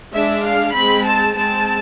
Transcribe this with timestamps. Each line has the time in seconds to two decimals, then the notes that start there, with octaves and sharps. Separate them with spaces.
0.13 G#3 D4 E5
0.44 F5
0.74 G#3 C4 B5
1.05 A5
1.35 G#3 C4 A5